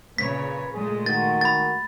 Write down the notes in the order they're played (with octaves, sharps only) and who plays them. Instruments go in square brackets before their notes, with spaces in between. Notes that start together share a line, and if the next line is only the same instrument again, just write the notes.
[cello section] A#2 C#3 C#5 [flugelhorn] B4 [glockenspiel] B6
[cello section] A#2 G#3 A3 [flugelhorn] G#4
[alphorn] D#3 [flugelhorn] F#4 [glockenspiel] A6
[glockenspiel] B5 A6